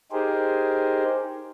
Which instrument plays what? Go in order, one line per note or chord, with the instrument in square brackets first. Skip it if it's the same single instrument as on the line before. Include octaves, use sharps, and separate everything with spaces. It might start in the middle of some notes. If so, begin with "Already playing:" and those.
[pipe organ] D#4 G4 G#4 A#4 C5